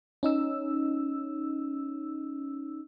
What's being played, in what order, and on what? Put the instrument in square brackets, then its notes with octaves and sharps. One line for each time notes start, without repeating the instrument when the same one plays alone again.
[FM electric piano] C#4 D#4 E6